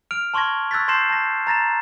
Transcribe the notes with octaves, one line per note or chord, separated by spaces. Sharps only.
F6 D7 F7
A5 C6 C#6 F6 G#6 A#6
C#6 E6 F#6 G#6 A6 B6
A5 C6 G6 A#6 C7 E7
A5 A#6
A#5 A6 A#6 E7